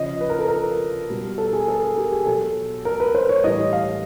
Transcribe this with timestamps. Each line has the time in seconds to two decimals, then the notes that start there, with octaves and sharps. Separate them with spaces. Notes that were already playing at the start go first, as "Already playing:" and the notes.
Already playing: C#3 F3 D#5
0.21 B4
0.30 A#4
0.39 A4
0.48 A#4
1.10 B2 G3
1.38 A4
1.53 G#4
1.68 A4
1.83 A#4
1.98 G4
2.12 G#4
2.26 B2 F#3 A4
2.85 A#4
3.00 B4
3.15 C5
3.29 C#5
3.44 A2 E3 G3 D#5
3.73 F5